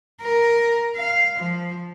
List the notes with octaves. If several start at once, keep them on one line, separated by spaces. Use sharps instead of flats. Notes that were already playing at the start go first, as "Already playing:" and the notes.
A#4
F5
F3